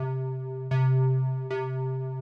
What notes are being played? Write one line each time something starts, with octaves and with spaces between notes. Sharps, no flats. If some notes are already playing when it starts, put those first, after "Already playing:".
Already playing: C3
C3
C3